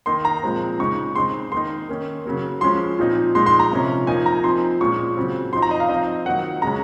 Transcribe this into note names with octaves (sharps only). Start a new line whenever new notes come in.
D#3 A#3 D#4 C6
A#5
A#2 F3 G#3 C4
C#3 G#3 D#4 C#6
C#3 G#3 C4 D#4 C6
D#3 A#3 D#4 C6
D#3 A#3 C#4
C#3 F#3 A#3
F3 G#3 C#4 C6
A#2 F3 C4 D#4
A#2 F3 G#3 D#4 C6
C6
A#5
C3 F3 A#3 C#4
F3 A#3 D#4 G#5
A#5
F3 C4 D#4 C6
A#2 G#3 C#4 C#6
C#3 F#3 C4
F3 C4 D#4 C6
A#5
D#5
F5
F3 C4 D#4 D#5
D#3 F#3 A#3 D#4 F#5
C#3 G#3 C#4 A#5